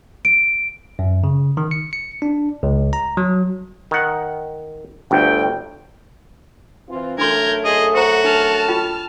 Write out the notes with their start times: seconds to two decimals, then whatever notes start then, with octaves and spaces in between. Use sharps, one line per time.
0.25 D7
0.99 F#2
1.24 C#3
1.57 D#3
1.71 C#7
1.93 C#7
2.22 D4
2.63 C#2
2.93 A#5
3.17 F#3
3.91 D#3 F#5
5.11 G1 D2 G5
6.89 E3 C4 F4
7.18 F#2 A3 D4 A4 A#4 C6 G6 G#6
7.65 G#4 C5 D#5
7.95 F#4 C5 F#5 A#5
8.24 D4 A5 F6
8.68 F4 G4 G5